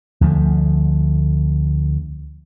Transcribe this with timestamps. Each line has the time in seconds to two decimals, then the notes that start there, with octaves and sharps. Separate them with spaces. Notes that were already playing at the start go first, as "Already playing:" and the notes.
0.21 D2 F3 A3